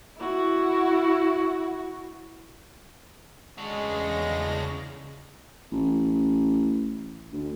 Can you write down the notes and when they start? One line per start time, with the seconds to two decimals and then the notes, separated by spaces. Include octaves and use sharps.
0.18 E4 F#4
3.58 E2 C#3 G#3 D4 F#4 A#6
5.72 A1
7.32 D2